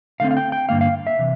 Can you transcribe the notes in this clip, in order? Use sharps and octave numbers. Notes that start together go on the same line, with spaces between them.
D3 A3 C4 F5
F5
G5
G5
G2 D3 G3 A#3 F5
F5
E5
C3 E3